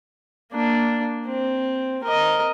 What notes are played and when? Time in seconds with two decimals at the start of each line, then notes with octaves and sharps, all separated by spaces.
0.52 A#3 D4
1.26 C4
2.04 A#4 D#5